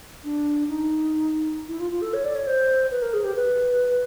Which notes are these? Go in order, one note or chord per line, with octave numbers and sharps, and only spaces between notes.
D4
D#4
E4
F4
F4
A4
C#5
D5
C#5
C5
B4
A#4
G#4
G4
B4